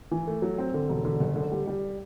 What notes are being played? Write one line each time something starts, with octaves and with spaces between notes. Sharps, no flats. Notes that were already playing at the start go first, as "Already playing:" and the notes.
E3
A3
F#3
C4
D3
E1
D3
F#1
D3
G3
G3